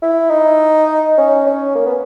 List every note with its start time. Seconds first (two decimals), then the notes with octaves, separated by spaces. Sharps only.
0.02 E4
0.31 D#4
1.18 C#4
1.46 C#4
1.75 A#3
1.86 B3